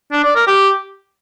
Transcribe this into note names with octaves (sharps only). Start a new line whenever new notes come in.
D4
D5
A#4
G4